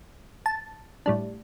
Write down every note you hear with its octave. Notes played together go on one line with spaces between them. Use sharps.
A5
A2 G3 D4